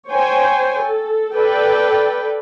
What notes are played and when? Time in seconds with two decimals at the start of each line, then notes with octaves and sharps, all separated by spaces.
0.10 C5 C#5 G5 G#5
0.82 A4
1.35 A4 B4 D5 G5